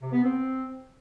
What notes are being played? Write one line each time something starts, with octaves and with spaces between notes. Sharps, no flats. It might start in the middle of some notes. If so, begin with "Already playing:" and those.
C3
B3
C4